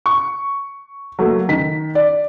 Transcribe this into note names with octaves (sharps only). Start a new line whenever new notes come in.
C#6
F#3 A3 A#3
D#3 B6
D5